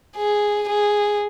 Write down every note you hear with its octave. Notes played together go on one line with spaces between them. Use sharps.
G#4
G#4